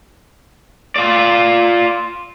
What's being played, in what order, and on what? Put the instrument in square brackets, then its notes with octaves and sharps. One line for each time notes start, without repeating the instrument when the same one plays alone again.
[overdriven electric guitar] F4 D5